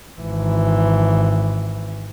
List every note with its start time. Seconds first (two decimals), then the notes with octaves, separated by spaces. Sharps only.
0.20 G#1 E3